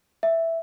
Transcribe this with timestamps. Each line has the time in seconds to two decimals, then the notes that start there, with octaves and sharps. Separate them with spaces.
0.23 E5